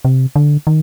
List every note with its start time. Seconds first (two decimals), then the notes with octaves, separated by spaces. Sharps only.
0.05 C3
0.36 D3
0.67 D#3